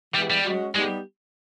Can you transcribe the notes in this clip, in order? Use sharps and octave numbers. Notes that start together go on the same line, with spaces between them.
E3 G3 G#3 B3
G3
G#3 C#4 F#4
G3 G#3 B3 D#4 G4